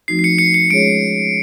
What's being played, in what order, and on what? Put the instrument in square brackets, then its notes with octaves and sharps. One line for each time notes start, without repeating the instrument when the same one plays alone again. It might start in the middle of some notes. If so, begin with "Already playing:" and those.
[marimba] F3 A3 C4 D#4 F#4 [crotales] C7
[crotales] C7
C#7
C#7
C#7
[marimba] G#3 C#4 F4 G#4 C#5 [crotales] D7